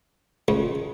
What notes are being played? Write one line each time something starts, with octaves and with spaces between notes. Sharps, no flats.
C#2